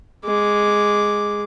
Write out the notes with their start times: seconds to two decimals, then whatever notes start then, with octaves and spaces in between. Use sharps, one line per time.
0.25 G#3 D6